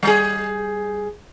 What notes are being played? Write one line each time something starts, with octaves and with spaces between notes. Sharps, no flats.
G3 G#4